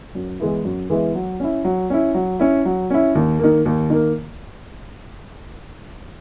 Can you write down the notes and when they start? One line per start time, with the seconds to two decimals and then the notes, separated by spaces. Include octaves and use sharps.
0.15 F#2
0.40 E3 G#3 B3 E4
0.64 F#2
0.90 E3 G#3 B3 E4
1.15 F#3
1.40 C#4 E4
1.64 F#3
1.90 C#4 E4
2.14 F#3
2.39 C#4 E4
2.65 F#3
2.90 C#4 E4
3.15 D#2
3.39 D#3 A#3
3.66 D#2
3.90 D#3 A#3